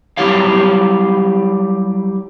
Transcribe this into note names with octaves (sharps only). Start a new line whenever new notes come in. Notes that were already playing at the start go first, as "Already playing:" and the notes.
F#3 G3 E4 G4 C#5 F5